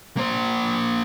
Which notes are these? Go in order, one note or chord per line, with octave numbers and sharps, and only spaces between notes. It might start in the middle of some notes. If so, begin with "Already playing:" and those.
A#3 C5